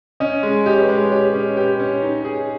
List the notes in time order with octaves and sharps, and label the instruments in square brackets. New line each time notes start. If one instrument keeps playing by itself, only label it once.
[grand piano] C#4 [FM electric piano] D#5
[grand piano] G#3
[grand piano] G4 [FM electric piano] D#5
[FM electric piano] C#5
B4
[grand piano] G#3 [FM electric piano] C#5
[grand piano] G4 [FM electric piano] C#5
[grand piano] C#4
[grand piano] G4 [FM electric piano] B4
[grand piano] C#4
D#4
G#4